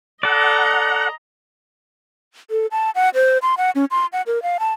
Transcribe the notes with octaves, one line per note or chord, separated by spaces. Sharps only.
A4 D5 D#5 F#5 A#5
A4
A5
F#5
C5
C6
F#5
C#4
C6
F#5
A#4
F5
A5